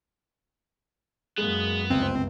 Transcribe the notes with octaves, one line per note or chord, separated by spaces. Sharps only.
F#2 G#3 A#3 B3
G1 C#2 C4